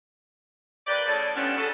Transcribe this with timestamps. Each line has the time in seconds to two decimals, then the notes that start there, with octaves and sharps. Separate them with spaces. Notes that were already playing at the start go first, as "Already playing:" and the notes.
0.87 A#3 G4 B4 D5
1.06 A2 C#3 D5
1.35 F3 G3 A3 B3 C#4 D4
1.56 C#3 F#3 A4